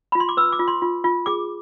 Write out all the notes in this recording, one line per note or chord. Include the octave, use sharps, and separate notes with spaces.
F4 B5
C6
D6
B4 E6
D6
F4
C6
F4
F4
G#4 D6